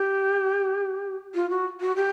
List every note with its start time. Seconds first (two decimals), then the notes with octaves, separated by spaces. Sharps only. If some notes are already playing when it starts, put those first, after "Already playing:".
Already playing: G4
1.35 F4
1.50 F#4
1.81 F#4
1.96 G4